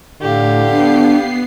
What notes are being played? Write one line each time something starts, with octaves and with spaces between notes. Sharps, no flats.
A2 D3 G4 F5
B3 D4 C7